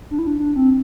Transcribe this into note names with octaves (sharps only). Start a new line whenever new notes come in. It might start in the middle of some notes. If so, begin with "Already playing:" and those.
D4
E4
D4
D4
C4